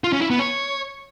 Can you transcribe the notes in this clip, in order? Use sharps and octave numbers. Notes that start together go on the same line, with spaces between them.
F4
C#4
E4
B3
C#5